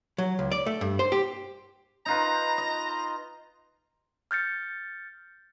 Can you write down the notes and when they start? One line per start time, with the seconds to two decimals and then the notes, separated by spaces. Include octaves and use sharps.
0.18 F#3
0.39 C#2
0.52 D5
0.66 A3
0.81 G2
0.99 C5
1.12 G4
2.06 D#4 F4 B4 A#5
2.58 D#5
4.31 F6 G6 A6 C#7